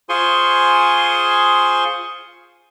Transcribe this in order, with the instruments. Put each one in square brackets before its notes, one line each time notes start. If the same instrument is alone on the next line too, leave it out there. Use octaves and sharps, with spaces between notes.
[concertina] F4 G#4 C5 G#5 C6 C#6